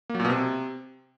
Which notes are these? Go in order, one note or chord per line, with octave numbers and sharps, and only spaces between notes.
A#3
F#3
A#2
B2
C3